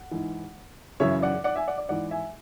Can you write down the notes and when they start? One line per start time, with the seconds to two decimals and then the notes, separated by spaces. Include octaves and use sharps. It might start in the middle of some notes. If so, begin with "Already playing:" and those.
Already playing: F#5
0.11 G#2 E3
1.00 F#2 C#3 E3 C#5 E5
1.22 D5 F#5
1.44 D5 F#5
1.56 E5 G#5
1.68 D5 F#5
1.78 D5
1.89 G#2 E3 D5 F#5
2.11 E5 G#5